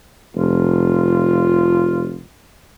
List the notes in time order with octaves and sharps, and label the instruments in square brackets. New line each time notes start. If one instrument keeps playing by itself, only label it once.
[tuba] F1 [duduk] F4